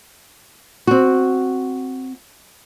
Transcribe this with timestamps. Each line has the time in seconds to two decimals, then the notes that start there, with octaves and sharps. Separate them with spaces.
0.87 C4 F#4